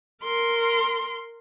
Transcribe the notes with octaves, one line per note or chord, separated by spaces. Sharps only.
A#4 C6